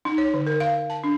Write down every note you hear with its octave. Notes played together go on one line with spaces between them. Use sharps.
D#4
C#5
D3
A#4
F5
A5
D4